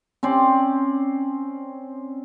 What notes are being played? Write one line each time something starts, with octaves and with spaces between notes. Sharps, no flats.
C4 C#4 C5 D5